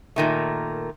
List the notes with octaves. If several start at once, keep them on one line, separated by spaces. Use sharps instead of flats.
A#2 D#3 A3